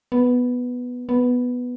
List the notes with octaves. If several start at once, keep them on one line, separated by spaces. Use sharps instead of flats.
B3
B3